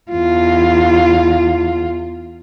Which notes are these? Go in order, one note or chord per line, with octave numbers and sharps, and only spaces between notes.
E2 F4